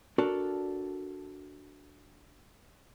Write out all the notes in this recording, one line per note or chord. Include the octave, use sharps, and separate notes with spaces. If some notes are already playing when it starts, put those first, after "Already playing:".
D4 F#4 A4 A#4 D5